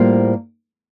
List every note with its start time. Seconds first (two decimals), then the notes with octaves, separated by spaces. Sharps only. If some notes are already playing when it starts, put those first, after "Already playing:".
Already playing: A2 G3 A#3 F4 C5